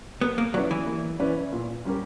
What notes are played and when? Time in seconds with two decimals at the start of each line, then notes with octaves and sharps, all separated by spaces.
0.21 A#3 B3
0.38 A#3
0.54 F#3 C#4 E4 B4 D5
0.71 E3
0.86 A#3
1.20 C#4 E4 B4 D5
1.53 A#2
1.85 G3 C#4 G4 A#4